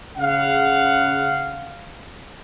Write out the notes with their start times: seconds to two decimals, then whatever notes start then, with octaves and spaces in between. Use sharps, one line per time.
0.18 C#3 F5 F#5